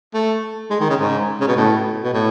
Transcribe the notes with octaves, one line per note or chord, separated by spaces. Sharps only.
A3
G#3
D#3
C#3
G#2
C#3
B2
A2
B2
A2